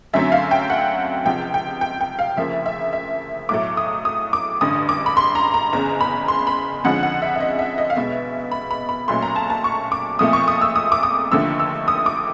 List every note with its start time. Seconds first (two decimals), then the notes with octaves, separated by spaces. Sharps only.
0.13 F#2 D3 F#3 A3 C4 E5
0.32 F5
0.51 G5
0.70 F#5
1.25 C#2 C3 F3 G5
1.54 G5
1.81 G5
2.01 G5
2.19 F5
2.37 D2 C#3 F3 A#3 E5
2.66 E5
2.93 E5
3.49 B1 A2 F#3 A3 D6
3.77 D#6
4.05 D#6
4.33 D6
4.61 A1 G2 D3 D#6
4.89 D6
5.06 B5
5.17 C6
5.35 A#5
5.54 A#5
5.73 F#1 E2 C#3 A#5
6.01 B5
6.28 C6
6.47 B5
6.84 F2 D3 F3 G#3 C#4 F#5
7.03 F#5
7.22 E5
7.35 E5
7.40 D#5
7.59 E5
7.78 D#5
7.90 F5
7.96 B1 B2 G#3 B3 E5
8.51 B5
8.71 B5
8.89 B5
9.08 B1 A#2 F#3 A3 C#4 C6
9.22 A#5
9.36 A5
9.50 A5
9.64 C#6
9.92 D6
10.19 B1 A#2 F3 A3 C4 D#6
10.33 C#6
10.48 D#6
10.61 E6
10.76 D#6
10.92 D6
11.03 D#6
11.31 F1 D#2 D3 F3 A3 E6
11.60 E6
11.88 D#6
12.06 D6